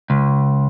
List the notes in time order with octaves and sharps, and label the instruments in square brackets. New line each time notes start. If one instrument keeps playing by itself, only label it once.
[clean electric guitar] C#2